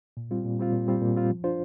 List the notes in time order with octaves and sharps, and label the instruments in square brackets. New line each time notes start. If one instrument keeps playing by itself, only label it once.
[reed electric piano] A#2
G3 C4 F4
A#2
G3 C4 F4
A#2
G3 C4 F4
A#2
G3 C4 F4
F3
D4 F4 C5